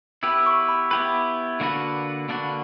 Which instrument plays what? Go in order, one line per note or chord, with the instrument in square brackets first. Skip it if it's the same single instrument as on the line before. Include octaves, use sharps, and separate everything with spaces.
[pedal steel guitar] B3 E4 G4 B4 [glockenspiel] E6
[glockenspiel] C#6
B5
[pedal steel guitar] B3 E4 G4 B4 [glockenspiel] B5
[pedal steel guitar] D3 A#3 D4 F#4 B4
D3 A#3 D4 F#4 B4